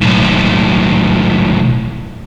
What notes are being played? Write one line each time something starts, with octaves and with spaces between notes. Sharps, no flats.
B1 A2